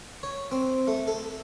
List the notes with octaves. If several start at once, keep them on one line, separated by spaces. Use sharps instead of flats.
C#5
C4
A3
A4